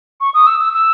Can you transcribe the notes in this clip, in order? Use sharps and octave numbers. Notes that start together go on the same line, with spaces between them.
C#6
D#6
E6
E6
E6